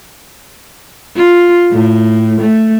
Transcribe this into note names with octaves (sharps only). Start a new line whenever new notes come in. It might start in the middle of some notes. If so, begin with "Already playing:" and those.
F4
A2
A3